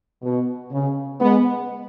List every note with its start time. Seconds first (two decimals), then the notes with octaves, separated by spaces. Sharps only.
0.22 B2
0.72 C#3
1.20 G#3 B3